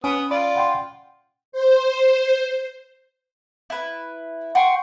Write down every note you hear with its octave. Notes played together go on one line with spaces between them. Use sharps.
B3 C#4 D#6 D7
F4 D5 B5
F#5 G5 C6
C5
E4 B4
F#5 G5 C6 C#6